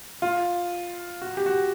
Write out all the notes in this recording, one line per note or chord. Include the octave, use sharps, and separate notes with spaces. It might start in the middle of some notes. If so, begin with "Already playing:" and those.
F4
F#4
G4
F#4